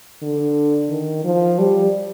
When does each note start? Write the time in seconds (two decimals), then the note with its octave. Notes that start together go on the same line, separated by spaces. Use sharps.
0.22 D3
0.89 D#3
1.24 F3
1.58 G3